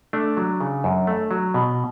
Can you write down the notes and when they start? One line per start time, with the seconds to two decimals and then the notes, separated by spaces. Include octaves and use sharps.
0.13 A3 D4
0.37 F#3
0.60 C#3
0.84 F#2
1.07 A3
1.31 F#3
1.54 B2